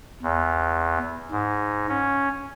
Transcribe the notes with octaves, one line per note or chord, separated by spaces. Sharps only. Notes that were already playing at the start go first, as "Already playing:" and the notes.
E2
G#2
C#4